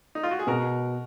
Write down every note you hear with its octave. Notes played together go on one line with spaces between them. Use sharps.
D#4
F4
F#4
G#4
B2 F#4 A#4